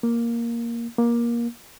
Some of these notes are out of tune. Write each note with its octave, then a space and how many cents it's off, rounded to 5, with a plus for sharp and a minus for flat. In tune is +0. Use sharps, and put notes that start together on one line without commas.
A#3 +5
A#3 +20